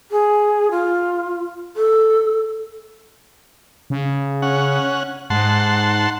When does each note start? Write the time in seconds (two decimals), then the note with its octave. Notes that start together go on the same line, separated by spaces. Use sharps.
0.11 G#4
0.71 F4
1.76 A4
3.90 C#3
4.42 C#4 F#5
5.30 G#2 F#5 A5 C6